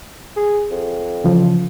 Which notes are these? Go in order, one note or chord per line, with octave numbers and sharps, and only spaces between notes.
G#4
F2
C#3 E3 F3